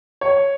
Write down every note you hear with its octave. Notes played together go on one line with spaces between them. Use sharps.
C#5